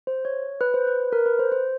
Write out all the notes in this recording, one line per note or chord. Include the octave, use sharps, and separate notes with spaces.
C5
C#5
B4
C5
B4
A#4
B4
C5
C5